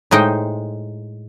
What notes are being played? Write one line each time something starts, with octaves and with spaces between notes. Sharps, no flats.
A2 G#3 D#4 C5 G5